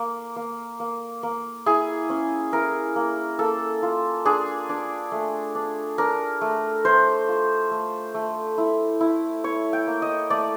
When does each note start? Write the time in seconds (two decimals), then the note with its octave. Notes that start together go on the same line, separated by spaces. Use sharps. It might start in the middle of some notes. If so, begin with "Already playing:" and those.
Already playing: A#3
0.36 A#3
0.80 A#3
1.23 A#3
1.66 E4 G#4
2.10 C#4
2.53 E4 A#4
2.96 A#3
3.39 A#3 A4
3.83 F4
4.25 D4 G#4
4.69 D4
5.12 A3
5.55 D4
5.98 D4 A#4
6.41 A3
6.85 A3 C5
7.28 F4
7.71 A3
8.14 A3
8.58 E4
9.01 E4
9.44 E4 C#5
9.73 G5
9.87 A#3
10.02 D#5
10.30 A3 D5